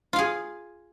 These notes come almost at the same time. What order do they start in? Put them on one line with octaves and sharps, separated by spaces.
F4 F5 G#4